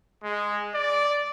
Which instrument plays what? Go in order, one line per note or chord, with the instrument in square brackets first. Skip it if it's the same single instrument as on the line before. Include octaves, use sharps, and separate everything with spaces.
[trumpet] G#3
D5